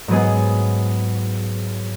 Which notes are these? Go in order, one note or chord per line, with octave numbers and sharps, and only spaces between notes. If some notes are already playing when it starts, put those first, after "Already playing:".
G#2 F#3 B3 G#4